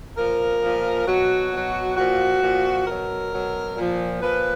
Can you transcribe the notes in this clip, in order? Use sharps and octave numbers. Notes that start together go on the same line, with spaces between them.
A#2 F3 A#4
A#2 F3
B2 F#3 F#4
B2 F#3
A#2 F3 F#4
A#2 F3
B2 F#3 A#4
B2 F#3
A#2 F3
A#2 F3 B4